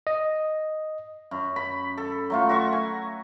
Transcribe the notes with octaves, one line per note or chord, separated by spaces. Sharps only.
D#5
F#2
B5
A4
F#3 A3 F4
F#4 E5 C#6
G#5